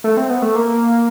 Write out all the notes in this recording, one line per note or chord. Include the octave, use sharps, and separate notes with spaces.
A3
C4
B3
A3
A#3